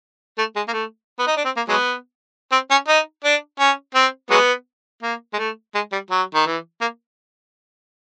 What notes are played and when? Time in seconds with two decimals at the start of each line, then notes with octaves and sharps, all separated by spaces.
0.38 A3
0.56 G#3
0.68 A#3
0.73 A3
1.19 B3
1.27 D#4
1.37 D4
1.45 C4
1.56 A#3
1.68 F#3 G#3 B3
2.52 C4
2.70 C#4
2.88 D#4
3.24 D4
3.60 C#4
3.95 C4
4.30 F#3 G#3 B3
5.02 A#3
5.33 G#3
5.38 A3
5.75 G#3
5.92 G3
6.11 F#3
6.35 D#3
6.46 E3
6.81 A#3